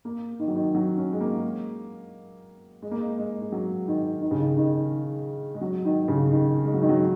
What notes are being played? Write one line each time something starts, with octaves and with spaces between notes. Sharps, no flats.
A#3
D#3
F#3
D#3
F#3
C#4
G#3
A#3
G#3
A#3
G#3
G#3
G#3
F#3
D#3
D#3
C#3
D#3
D#3
G#3
F#3
D#3
C#3
D#3
G#3
F#3
D#3
F#3